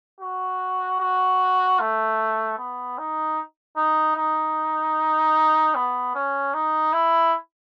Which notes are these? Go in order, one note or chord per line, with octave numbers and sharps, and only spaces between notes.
F#4
F#4
A3
B3
D#4
D#4
D#4
B3
C#4
D#4
E4